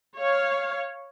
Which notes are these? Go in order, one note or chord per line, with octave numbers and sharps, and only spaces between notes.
C#5 F5